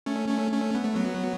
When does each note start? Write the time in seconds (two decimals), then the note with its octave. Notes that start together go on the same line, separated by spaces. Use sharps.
0.06 A3 C#4
0.28 A3 C#4
0.52 A3 C#4
0.75 B3
0.85 A3
0.95 F#3 B3